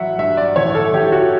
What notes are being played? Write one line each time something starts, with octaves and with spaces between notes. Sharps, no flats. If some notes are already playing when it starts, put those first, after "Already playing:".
Already playing: A1 F#3 E5 F#5
G2 E5
D5
A1 C#5
A4
A1 G4
F#4